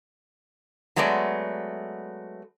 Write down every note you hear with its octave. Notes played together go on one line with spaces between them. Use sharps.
F#3 G#3 A3 B3 D5